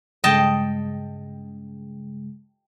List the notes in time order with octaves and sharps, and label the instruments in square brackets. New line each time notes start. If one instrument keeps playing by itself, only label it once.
[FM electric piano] G2 C#3 G#3 [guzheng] D#5 G5 A5